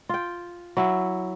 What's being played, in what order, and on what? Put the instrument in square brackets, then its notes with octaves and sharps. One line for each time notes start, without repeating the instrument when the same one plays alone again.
[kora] F4 G5
F#3 E4